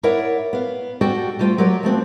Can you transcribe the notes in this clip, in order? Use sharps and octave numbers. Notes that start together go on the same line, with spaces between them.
E4 A#4 C#5 D5 E5 F#5
B3 F5
F#4 G4 A4 D5 F#5 G5
G3 A3 F4 C5 G5
F#3 G4 A#4 C#5 D5
F3 A3 C4 F#4